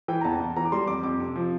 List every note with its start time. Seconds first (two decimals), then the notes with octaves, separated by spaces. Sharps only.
0.08 E3 G5
0.21 A#5
0.24 E2 A5
0.40 E2
0.56 E3 A#5
0.65 D6
0.72 G3 C6
0.87 F2 D6
1.03 F2 D6
1.20 C3
1.36 F3